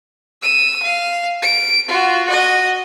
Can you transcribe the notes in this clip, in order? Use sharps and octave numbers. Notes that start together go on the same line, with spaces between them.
E6 D#7
F5
D7
F4 F#4
F#4 D#5